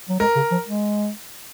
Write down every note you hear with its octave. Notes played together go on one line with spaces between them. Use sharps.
F#3
G#3 A#4
C#3
F3
G#3